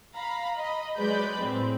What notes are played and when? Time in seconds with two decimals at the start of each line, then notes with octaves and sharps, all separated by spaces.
0.15 F5 A#5 B5
0.56 D#5 B5
0.98 F#3 G#3 B4 D5 B5 G6
1.41 A2 C4